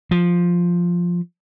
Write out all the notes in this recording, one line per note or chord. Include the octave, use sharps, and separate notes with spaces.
F3